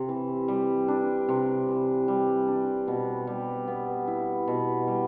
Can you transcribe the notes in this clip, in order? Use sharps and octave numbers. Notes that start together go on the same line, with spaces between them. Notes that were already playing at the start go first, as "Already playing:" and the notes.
Already playing: C3
E3
G3
D4
C3
E3
G3
D4
B2
G3
B3
E4
B2
G3